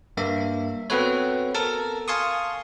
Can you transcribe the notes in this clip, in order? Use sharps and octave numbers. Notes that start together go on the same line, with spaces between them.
G2 A#3 E5
B3 C4 F#4 A4 B4 C#5
A4 A#4 A5
F5 G#5 A5 C6 C#6 D#6